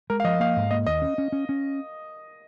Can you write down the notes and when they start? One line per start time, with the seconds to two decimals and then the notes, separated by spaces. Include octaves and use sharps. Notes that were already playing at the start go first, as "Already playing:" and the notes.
0.10 G#3 A#4
0.20 F5
0.24 F3 D#5
0.40 A#3 F5
0.56 G#2
0.71 A#3 D#5
0.87 D#2 D#5
1.02 C#4
1.18 C#4
1.32 C#4
1.49 C#4